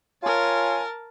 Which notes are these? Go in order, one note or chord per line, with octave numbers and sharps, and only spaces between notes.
F4 A#4 C#5 G#5 A5